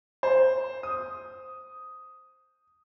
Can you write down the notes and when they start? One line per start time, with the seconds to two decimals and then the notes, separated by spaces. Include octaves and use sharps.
0.23 C5
0.83 D#6